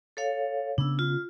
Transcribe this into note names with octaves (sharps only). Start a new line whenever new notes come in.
A4 C#5 F5
C#3 B3 D4 E6
F4